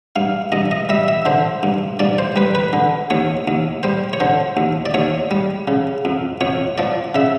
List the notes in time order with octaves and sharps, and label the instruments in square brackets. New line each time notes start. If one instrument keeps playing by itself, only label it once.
[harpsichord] G2 F5
G2 D#5
D#5
G3 E5
E5
D3 C5
G2
G2 D5
C5
G3 B4
B4
D3
D#2 C#5
D#2
G3 C5
C#5
D3 C5
D#2
D5
D#2 C#5
G3
C#3
F2
F2 C#5
F3 D5
C#3 E5